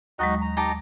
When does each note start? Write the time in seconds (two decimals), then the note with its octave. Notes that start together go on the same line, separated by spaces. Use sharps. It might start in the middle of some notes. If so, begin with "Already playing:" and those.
0.19 D#2 F#3 G#3 D#4 F#4 D#5
0.42 A#5
0.57 D#4 G4 A5